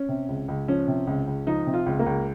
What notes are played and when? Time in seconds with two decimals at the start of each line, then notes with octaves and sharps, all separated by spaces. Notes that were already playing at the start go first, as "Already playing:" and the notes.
Already playing: C#4
0.08 C3
0.28 C#2
0.48 C#2
0.68 F3 C#4
0.88 C3
1.07 C#2
1.27 C#2
1.47 F3 D#4
1.67 C3
1.74 F4
1.86 C#2
1.99 A#3
2.06 C#2